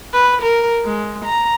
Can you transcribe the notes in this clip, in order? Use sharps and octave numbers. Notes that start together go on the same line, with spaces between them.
B4
A#4
G#3
A#5